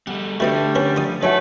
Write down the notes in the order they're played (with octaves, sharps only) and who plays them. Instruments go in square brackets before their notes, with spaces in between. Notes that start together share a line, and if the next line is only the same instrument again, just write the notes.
[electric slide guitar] G3 A3 [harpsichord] F#5
[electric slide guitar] D3 [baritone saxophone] G3 [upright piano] A3 [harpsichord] F#4 B4 D#5
[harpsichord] C#4 A#4 B4
F4 D5 D#6
[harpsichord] E3 F#3 D#4 [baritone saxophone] A3 [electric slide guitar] B4 [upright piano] C#5 E5 F#5